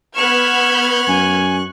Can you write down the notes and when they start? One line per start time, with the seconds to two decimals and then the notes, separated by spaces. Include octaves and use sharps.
0.15 B3 C#6 F6 F#6 G#6 E7
1.08 F#2 G#5